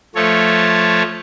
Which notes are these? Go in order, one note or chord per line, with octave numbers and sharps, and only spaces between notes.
F3 A3 A4 C#5